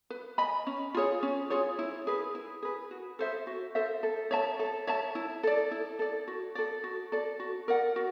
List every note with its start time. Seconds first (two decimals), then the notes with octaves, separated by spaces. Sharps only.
0.10 B4
0.38 D#5 G#5 B5
0.67 C#4
0.94 F4 G#4 C#5
1.23 C#4
1.50 F4 G#4 C#5
1.79 E4
2.07 G#4 B4
2.35 E4
2.62 G#4 B4
2.91 F#4
3.19 A4 C5 E5
3.47 F#4
3.75 A4 C5 E5
4.03 A4
4.31 C#5 E5 A5
4.59 A4
4.87 C#5 E5 A5
5.15 E4
5.43 A4 D5
5.71 E4
5.99 A4 D5
6.28 F#4
6.55 A4 D5
6.84 F#4
7.12 A4 D5
7.40 F#4
7.68 A#4 D5 F#5
7.96 F#4